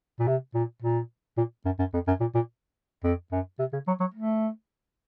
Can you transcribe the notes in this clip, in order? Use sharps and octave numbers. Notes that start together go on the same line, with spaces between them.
A#2
C3
A#2
A#2
A#2
F#2
F#2
F2
F#2
A#2
A#2
F2
F#2
C3
C#3
F#3
F#3
A3